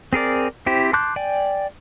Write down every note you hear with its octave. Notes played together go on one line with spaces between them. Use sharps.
C4 G#4 A#4 D5
C4 E4 G4 C5
A5 C6 D6 F#6 G6
D5 G5 G#5